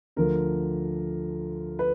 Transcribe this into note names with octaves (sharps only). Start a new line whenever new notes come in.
D2 D3 F3 A#4
B4